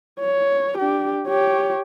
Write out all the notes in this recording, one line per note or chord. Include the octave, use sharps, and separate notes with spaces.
C#5
D4 G4
G4 C#5